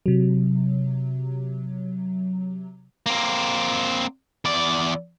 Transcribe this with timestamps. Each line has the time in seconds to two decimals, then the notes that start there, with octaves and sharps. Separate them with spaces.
0.06 C3 F#3
3.06 A#3 C4
4.45 E2 D5